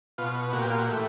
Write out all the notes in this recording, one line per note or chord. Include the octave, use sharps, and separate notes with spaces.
B2 F4
A#2 F#4
G4
F4
F#4
A2 E3 G4